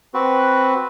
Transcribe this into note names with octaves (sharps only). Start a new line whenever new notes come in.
C4 F#4 B4